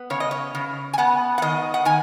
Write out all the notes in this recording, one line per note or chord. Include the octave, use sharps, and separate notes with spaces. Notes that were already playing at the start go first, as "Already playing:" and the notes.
Already playing: B3
C#3 C#5
D#5
C#5
C#3
G#5
B3 F#5
F#5
D#3 D#5
F#5
D#3 G#5